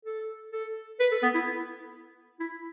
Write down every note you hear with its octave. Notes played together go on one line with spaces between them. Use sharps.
A4
A4
B4
A4
B3
E4
E4